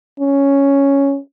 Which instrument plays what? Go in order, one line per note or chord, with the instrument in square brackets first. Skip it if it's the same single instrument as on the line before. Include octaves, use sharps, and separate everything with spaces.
[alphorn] C#4